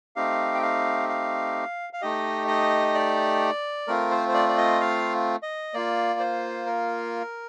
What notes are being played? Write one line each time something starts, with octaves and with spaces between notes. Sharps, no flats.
A3 C4 D#4 G4 F5
G5
F5
F5
F5
A3 D#4 G4 D#5
D#5
D5
A3 C4 F4 A#4
C5
C5
D5
D5
D#5
F5
D#5
A#3 F4 D5
C5
A#4